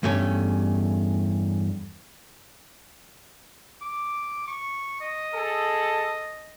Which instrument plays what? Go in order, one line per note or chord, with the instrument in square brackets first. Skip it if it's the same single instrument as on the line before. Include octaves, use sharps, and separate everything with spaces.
[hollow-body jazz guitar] E2 G2 A3 C#4 C#5
[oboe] D6
C#6
D#5
[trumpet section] G#4 A4